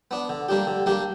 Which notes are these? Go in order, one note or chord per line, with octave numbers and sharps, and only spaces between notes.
B3 D4
D3
G3 A#3 D4 G4
D3
G3 A#3 D4 G4